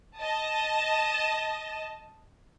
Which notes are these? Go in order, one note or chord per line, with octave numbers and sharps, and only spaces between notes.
D#5 A5